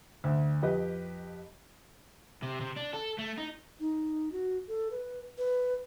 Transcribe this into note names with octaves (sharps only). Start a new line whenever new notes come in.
D2
F2 G4 B4 D#5
C3
C3
D4
A4
A3
D#4
D#4
F#4
A4
B4
B4